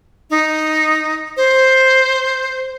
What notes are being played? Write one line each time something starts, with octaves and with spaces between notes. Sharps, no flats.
D#4
C5